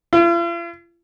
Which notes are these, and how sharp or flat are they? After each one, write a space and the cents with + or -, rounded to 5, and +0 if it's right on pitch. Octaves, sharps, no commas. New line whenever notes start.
F4 -45